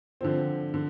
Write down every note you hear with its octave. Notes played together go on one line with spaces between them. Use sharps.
D3 F3 C4
D3